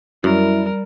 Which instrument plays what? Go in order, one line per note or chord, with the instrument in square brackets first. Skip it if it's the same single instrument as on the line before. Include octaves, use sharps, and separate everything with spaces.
[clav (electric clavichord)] F#2 [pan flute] G3 [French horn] E4 [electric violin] A#4